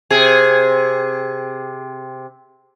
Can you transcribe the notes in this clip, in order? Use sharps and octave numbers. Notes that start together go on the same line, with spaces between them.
C3 G#4